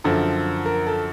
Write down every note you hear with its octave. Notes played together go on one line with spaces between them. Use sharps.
F#2 D3 F3 A4
A#4
A4